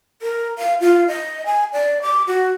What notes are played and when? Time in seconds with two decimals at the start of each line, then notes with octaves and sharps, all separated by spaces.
0.22 A#4
0.59 F5
0.81 F4
1.08 D#5
1.46 G#5
1.73 D5
2.02 D6
2.27 F#4